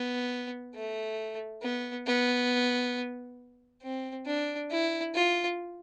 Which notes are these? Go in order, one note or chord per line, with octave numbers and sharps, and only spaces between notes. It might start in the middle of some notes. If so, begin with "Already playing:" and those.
Already playing: B3
A3
B3
B3
C4
D4
E4
F4